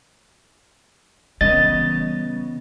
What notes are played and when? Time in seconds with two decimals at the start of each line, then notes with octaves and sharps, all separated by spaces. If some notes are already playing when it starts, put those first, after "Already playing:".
1.41 C#3 E3 G3 B3 D#5 A6